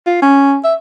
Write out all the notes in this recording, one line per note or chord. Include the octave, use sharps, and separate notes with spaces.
F4
C#4
E5